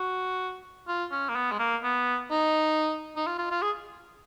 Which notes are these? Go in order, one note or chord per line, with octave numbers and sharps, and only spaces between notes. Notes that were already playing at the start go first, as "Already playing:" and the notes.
Already playing: F#4
F4
C#4
A#3
B3
G#3
A#3
B3
D#4
D#4
F4
F4
F4
G#4